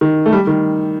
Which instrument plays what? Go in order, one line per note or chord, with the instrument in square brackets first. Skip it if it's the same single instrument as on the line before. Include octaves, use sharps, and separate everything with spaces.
[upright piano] D#3
A3
G3
D#3